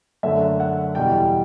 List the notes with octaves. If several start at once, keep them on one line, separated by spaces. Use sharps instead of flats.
F#2 D3 A3 E5
F#5
E2 B2 G3 G5